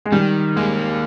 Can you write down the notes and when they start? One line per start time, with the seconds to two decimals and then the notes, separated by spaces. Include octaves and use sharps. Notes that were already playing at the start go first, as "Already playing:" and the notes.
0.06 G#3
0.12 D#3 G3
0.56 G#3 A#3